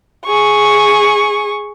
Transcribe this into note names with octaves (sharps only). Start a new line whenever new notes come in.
G#4 C#6